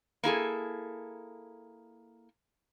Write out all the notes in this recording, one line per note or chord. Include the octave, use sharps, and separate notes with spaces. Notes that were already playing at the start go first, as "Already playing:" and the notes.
A#3 E4 G#4 A4